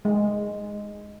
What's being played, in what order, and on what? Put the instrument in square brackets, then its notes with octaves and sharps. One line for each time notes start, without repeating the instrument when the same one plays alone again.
[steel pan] G#3